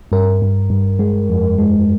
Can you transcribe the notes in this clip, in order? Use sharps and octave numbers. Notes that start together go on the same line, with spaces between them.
G2 A#4
G2
G2
G#3
F2
G#3